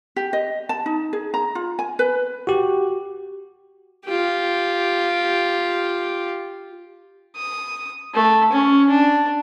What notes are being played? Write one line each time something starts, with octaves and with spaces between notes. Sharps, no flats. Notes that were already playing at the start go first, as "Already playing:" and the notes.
G4
D#5
A5
D#4
G#4
A#5
F4
G#5
B4
F#4 G4
F4 G4
D#6
A3
C#4
D4